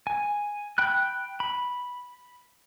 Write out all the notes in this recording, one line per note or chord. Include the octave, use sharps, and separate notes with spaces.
G#5
G5 B5 F#6
B5